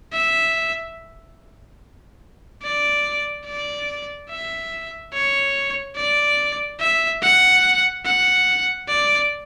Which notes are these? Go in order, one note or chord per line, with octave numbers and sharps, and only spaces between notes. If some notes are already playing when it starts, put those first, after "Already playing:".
E5
D5
D5
E5
C#5
D5
E5
F#5
F#5
D5